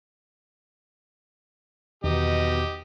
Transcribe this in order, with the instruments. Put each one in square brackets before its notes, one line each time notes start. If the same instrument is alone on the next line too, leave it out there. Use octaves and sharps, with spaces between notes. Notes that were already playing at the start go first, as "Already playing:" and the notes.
[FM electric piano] E2 D#3 [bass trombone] B2 [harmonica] D#4 G4 D#5